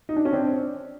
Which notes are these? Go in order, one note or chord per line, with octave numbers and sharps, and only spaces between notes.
D#4
D4
C#4
C4 D4